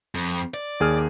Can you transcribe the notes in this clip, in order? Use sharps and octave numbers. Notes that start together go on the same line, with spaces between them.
F2
D5
D#2 G#4 F6